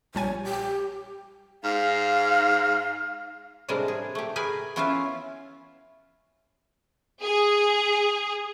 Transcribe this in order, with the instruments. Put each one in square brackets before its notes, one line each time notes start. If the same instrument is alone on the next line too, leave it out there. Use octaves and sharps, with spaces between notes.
[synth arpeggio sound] A#1 G3 G#5 [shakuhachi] C#5
[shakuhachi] G4
[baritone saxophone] G#2 [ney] F5 [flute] F6
[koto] A2 C3 G3 G#3 D4 A#4
G#4
A3 G4
G#4 A#4 B4 G5 G#5
B3 C#4 E4 F4 E5 F5
[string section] G#4